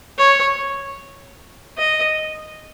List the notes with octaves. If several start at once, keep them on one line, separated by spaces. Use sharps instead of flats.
C#5
D#5